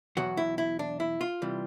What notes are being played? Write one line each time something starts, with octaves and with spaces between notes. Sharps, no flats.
E2 B2 F#3 F#4
E4
E4
D4
E4
F4
C3 E3 G3